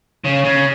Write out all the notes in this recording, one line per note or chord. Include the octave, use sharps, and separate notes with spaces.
C#3
C#3